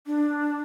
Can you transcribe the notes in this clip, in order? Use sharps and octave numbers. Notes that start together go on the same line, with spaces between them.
D4